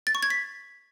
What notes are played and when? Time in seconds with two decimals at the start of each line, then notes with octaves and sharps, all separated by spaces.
0.07 A6
0.15 C#6
0.23 G#6
0.30 B6